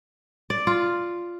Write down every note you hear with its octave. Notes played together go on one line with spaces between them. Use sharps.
D5
F4